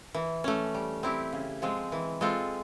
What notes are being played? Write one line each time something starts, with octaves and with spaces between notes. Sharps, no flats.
E3
A3 C#4
G3
C4 E4 G4
C#3
F3 G#3 C4
E3
G#3 C4 F4 A4